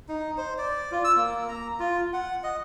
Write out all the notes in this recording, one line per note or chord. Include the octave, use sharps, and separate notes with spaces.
D#4
C5
D5
F4
E6
A#3
A#5
F4
F#5
D#5